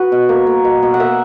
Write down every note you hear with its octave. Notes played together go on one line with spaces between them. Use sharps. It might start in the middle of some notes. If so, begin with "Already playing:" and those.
Already playing: F#4 B4
B2
A#3
A#3
B2
B2
F#5
A#3 E5